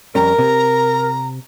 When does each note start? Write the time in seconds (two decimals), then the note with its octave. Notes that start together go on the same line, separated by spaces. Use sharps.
0.15 F2 G3 C#4 A#4 A#5
0.39 C3